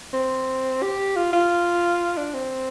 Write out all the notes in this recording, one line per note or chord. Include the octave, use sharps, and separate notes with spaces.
C4
G4
F4
F4
D4
C4